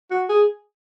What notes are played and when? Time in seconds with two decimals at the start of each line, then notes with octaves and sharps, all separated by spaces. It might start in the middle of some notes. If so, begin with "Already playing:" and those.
0.11 F#4
0.29 G#4